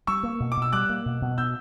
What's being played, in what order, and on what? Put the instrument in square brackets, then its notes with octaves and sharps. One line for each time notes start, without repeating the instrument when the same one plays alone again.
[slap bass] G3 [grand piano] C#6 E6
[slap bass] A#3
B2
[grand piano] D6
[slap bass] B2
[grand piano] E6
[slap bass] G3 [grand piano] D6 F#6
[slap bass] A#3
B2
B2
[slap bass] B2 [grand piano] E6 G6